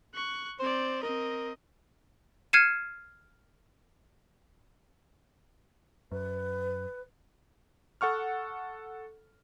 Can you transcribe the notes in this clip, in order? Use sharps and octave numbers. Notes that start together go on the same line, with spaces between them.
C#6 F#6
C4 C5 D5
C4 A#4 D#5
F6 G#6 C7 C#7 D#7 E7
F#2 B4
A4 F#5 C#6 F6